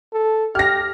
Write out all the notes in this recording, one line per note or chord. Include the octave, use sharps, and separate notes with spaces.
A4
G4 F6 A#6